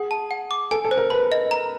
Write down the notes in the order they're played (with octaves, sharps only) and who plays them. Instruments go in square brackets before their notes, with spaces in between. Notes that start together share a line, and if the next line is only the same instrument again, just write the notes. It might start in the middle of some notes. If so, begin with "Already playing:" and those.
Already playing: [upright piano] G#4 [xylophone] F#5
[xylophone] A5
F#5
D6
[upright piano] A4 [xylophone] G#5
[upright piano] A4
[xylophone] C5
[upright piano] A#4
[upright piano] B4 [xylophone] B5
[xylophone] D#5
A#5